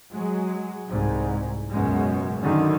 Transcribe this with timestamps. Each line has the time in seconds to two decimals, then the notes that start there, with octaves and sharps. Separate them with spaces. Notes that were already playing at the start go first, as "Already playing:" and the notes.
0.13 F#3 G#3
0.89 C2 G#2
1.70 C#2 F#2 B2 G#3
2.38 F#2 D3 D#3